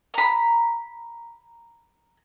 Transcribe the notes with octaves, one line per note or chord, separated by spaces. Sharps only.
A#5 B5